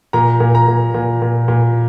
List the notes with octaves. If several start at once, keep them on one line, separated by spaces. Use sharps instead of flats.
A#2 A#5
A#2
A#5
A#2
A#2
A#2
A#2